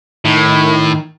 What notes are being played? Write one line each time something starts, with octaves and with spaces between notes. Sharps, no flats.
A2 D#3